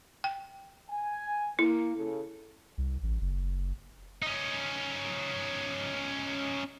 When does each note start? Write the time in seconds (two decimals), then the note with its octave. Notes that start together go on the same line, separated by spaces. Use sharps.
0.24 G5
0.89 G#5
1.59 A#3 E4
1.95 C#3 A4
2.78 C2
3.03 A1
3.21 F#1
4.22 C#4 D#4